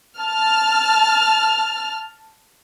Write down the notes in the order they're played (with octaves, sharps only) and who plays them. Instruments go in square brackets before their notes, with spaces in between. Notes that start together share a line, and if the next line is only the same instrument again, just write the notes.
[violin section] A5 F6